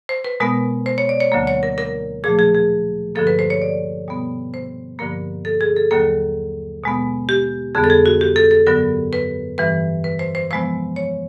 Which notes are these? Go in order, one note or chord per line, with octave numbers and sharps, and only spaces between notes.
C5
B4
B2 G#3 B3 A#4
C5
C#5
D5
C#5
D2 D3 F#3 A#3
C#5
A#4
A#4
A#2 F3 A3 G#4
G#4
G#4
G2 D3 F3 A#3 A4
B4
C5
C#5
D5
B2 G3 B3
C5
G2 D3 F3 A#3 A#4
A4
G#4
A4
D#2 D3 F#3 A#3 A4
B2 G#3 B3
G4
F2 D3 G3 B3 G#4
A4
G#4
F#4
G4
A4
A4
G2 D3 F#3 B3 A#4
B4
G2 E3 G3 B4
B4
C5
C5
C3 F3 G#3 B3 C5
C#5